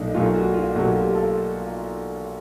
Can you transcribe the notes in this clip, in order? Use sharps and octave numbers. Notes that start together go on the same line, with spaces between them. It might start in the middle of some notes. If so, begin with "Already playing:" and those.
Already playing: B1 A#2 F#3 A3 D4 D#4
B1 A#2 F#3 A3 F4
F#4
F4
B1 A#2 F#3 A3 F#4
G4
A4